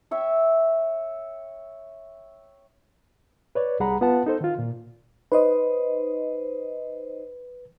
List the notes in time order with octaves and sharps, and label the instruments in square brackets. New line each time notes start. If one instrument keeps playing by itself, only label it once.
[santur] C#5 E5 G5
[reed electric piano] B4 C#5 D5
C2 G3 G#4 F#5 A#5 B5
B3 F4 B4 F#5 A5
D#4 A4 C5
D#3 F4
A#2
[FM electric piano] D#4 C5 D#5 [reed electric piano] B4